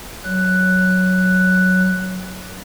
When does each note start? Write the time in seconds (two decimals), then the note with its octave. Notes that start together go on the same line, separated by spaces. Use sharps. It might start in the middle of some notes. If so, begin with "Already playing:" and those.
0.24 F#3 F#6